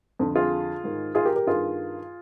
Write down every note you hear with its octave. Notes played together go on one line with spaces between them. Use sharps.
F2 D3
F4 G#4
G#2 D#3
F4 G#4
G4 A#4
G4 A#4
G2 D#3 F4 G#4